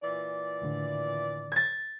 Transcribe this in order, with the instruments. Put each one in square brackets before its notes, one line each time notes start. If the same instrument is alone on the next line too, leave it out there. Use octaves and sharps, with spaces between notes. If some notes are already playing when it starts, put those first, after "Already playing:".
[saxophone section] A#2 E3 D5
[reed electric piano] D#2 A2 D3
[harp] G#6 A6